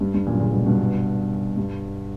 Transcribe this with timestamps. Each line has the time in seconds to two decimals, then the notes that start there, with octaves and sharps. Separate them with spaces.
0.01 G2
0.14 G2
0.27 F#2 A#2
0.40 A#2 C#3
0.53 G2 B2
0.66 G2 B2
1.57 G2